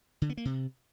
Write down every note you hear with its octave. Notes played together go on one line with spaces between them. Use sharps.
D3
B3
A#3
C3